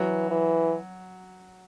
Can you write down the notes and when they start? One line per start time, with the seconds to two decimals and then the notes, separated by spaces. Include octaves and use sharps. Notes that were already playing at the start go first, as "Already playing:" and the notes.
Already playing: E3 F#3
0.30 E3